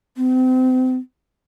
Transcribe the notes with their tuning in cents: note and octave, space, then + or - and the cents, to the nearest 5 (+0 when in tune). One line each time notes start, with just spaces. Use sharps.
C4 -35